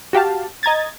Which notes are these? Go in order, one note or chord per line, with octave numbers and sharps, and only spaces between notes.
F#4 G4 F5 A5
D#5 A#5 G#6 A6